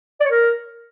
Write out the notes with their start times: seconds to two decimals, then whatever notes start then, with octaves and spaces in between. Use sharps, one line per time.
0.20 D5
0.25 C#5
0.30 A#4